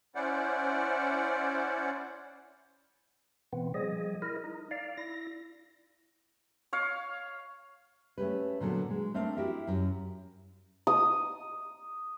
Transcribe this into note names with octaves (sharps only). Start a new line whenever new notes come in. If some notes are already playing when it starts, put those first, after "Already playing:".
C#4 E4 C5 D5 F#5
B2 E3 B3 C4
F3 G3 G#4 D#5
E4 A#4 D#5
D#4
D5 F5
E4 A#6
C#5 F5
A3 C#4 G4 B4
A#2 D3 F#3 B3 A4
G#3
A3 C4 D4 A#4 F5
E4 F#4 G4 A#4 E5
F#2
D#6